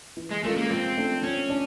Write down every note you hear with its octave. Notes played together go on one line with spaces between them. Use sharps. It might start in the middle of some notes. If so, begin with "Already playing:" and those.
E3
G#3
G#3 A3 C#4 F4 A#4
A#3
F3 C4
A3 D4
F3 C#4
D4